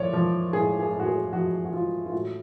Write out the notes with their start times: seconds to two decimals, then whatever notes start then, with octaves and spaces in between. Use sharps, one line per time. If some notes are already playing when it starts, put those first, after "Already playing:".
Already playing: A2 F3 C#5 D5
0.13 F3
0.53 A2 G#4
0.79 G#4
0.93 A2
1.00 F#4
1.06 G#4
1.33 F3 F#4
1.65 F#4
1.73 F3 F4
2.06 F4
2.12 A2 F#4